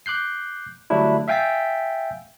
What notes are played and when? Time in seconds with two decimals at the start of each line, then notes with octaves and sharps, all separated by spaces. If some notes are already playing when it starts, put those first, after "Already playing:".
0.06 D6 F#6 G6 C7
0.90 D3 F#3 G3 A3 D4 E4
1.28 E5 F5 G5 G#5 A6 B6